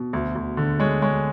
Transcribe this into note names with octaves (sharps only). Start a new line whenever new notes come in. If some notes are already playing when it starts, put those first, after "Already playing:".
Already playing: B2
D2
D2
D3
G#3 C#5
G#3 C#5